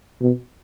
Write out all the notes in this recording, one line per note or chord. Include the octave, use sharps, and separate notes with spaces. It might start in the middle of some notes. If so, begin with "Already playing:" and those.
B2